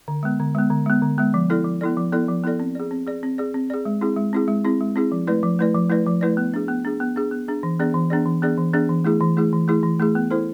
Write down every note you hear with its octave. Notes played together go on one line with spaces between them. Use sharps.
D3
G#3 B3
D3
G#3 B3
D3
G#3 B3
D3
G#3 B3
F3
B3 E4 A4 D5
F3
B3 E4 A4 D5
F3
B3 E4 A4 D5
F3
B3 E4 A4 D5
C4
G#4 D5
C4
G#4 D5
C4
G#4 D5
C4
G#4 D5
G#3
C4 E4 G#4
G#3
C4 E4 G#4
G#3
C4 E4 G#4
G#3
C4 E4 G#4
F3
A3 E4 B4 D5
F3
A3 E4 B4 D5
F3
A3 E4 B4 D5
F3
A3 E4 B4 D5
B3
D4 G#4
B3
D4 G#4
B3
D4 G#4
B3
D4 G#4
E3
B3 D4 G#4 D5
E3
B3 D4 G#4 D5
E3
B3 D4 G#4 D5
E3
B3 D4 G#4 D5
E3
A3 E4 G#4
E3
A3 E4 G#4
E3
A3 E4 G#4
E3
A3 E4 G#4
B3
E4 A4 C5